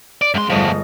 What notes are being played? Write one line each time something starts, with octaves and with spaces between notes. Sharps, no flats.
D5
F#2 G#3 C6
G1 F3 A3 D#5 A#6